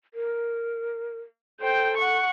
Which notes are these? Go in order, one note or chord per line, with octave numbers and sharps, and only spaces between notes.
A#4
A4 C5 G5
F#5 C#6